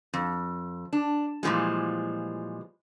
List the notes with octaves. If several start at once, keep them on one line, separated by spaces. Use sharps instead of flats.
F2
D4
A#2 E3 F3 G3 G#3